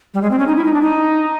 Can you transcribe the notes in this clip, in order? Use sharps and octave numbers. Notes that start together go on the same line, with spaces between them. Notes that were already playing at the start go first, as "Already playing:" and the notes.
G3
G#3
C4
C#4
D#4
E4
D#4
D4
D#4